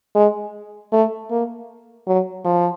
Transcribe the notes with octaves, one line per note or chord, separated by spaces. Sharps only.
G#3
A3
A#3
F#3
F3